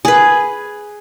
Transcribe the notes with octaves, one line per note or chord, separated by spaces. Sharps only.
G#4 B4